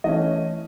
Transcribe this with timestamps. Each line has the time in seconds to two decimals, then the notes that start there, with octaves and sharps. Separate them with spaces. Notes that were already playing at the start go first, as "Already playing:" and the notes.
0.04 E3 A3 C#4 D#5